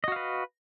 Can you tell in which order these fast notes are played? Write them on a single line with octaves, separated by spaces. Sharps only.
D#5 F#4 F5 B4